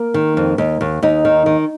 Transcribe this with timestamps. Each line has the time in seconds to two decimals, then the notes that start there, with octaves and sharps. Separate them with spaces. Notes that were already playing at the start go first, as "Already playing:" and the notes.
Already playing: A#3
0.14 D#3
0.37 F2
0.58 D#2
0.81 D#2
1.02 D#2 D#4
1.25 D#3
1.46 D#3